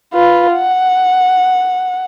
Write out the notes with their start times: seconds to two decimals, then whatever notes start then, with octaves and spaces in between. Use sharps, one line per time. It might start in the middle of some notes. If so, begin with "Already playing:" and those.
0.14 F4 B4
0.53 F#5